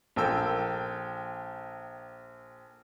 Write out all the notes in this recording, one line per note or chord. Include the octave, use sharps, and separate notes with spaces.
A#1 A4 A#4 G5 E6